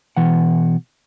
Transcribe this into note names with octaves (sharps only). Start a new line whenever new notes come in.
B2 E3 F#5